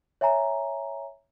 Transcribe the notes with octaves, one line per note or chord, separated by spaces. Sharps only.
C#5 E5 G#5 A#5